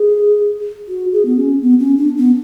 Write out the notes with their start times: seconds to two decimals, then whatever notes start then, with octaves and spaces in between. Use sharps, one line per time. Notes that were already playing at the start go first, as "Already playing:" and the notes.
Already playing: G#4
0.88 F#4
1.12 G#4
1.25 B3
1.37 C#4
1.61 B3
1.80 C#4
1.97 D4
2.17 B3